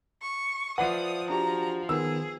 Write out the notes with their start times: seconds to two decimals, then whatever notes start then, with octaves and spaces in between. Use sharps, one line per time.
0.22 C#6
0.78 F3 B4 D5 E5 F#5 D#6 D#7
1.30 D4 F#4 G4 A#5
1.89 D#3 B3 G#4 E6